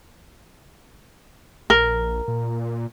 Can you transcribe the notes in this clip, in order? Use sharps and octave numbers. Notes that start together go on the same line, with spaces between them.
A#1 A#4
A#2